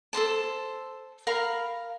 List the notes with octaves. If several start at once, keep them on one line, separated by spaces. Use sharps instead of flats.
A4 A#4 C5 A5
A#4 F5 B5